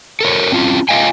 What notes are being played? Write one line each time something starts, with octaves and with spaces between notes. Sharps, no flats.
A4 A#4 C#5
C4 C#4 F4
F4 D#5 F5 G5 G#5